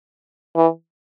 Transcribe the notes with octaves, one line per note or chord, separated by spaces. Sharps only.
E3